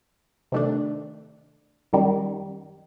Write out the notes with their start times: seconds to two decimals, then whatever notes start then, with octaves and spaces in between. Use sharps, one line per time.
0.52 C3 D#3 A3 D4
1.93 F#2 D#3 G3